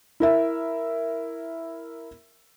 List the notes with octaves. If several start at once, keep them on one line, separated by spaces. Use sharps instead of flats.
E4 A#4 E5